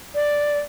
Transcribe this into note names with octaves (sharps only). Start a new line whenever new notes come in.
D5